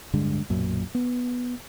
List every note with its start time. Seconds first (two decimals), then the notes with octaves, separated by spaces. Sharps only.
0.13 D1 G2 D3 G#3
0.50 B1 F#2 A#2
0.95 B3